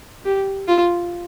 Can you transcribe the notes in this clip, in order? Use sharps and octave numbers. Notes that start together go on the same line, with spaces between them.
G4
F4